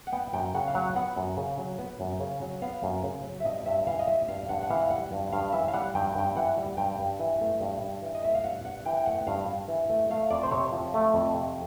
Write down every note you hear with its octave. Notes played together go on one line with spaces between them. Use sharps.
F#5
B3 G5
F#2 G5
C#3 F#5
F5
F#3 F#5
B3 F#5
F#2
C#3
F#3
B3
F#2
C#3
F#3
B3 F5
F#2
C#3
F#3
E5
G2 D#5
G2 E5
E3 F5
D#5
G3 E5
G2 F5
G2 F#5
F#5
E3 F5
G3 F#5
G2
G2 F5
E3 E5
F5
G3 F#5
G2 G5
G2 G5
E3 F#5
G3
G2 G5
G2
E3
A3
G2
G2
E3
D#5
A3 E5
F5
G2 F#5
G2 F#5
E3 G5
G5
A3 F#5
G2 F5
G2
E3
A3
A3 F5
F2 D5
C5
C3 C#5
F3
A3
F2
C3